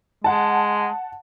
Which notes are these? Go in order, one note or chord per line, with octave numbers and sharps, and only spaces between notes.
G#3 F#5 A5